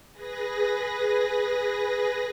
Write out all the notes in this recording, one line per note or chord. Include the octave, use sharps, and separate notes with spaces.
G#4 B4 A#6